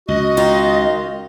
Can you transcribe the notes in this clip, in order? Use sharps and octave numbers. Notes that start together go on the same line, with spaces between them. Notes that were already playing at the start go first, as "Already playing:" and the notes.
C#2 F#4 D#5
D#3 F4